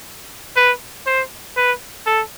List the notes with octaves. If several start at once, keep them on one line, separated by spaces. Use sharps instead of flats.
B4
C5
B4
A4